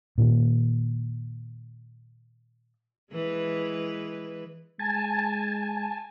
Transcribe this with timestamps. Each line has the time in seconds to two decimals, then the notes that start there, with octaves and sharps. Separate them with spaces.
0.18 A#2 D#3
3.12 E3 G#3 B4
4.79 G#3 G#5 A5